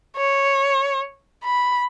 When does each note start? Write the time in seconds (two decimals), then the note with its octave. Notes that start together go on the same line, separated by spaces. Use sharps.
0.17 C#5
1.44 B5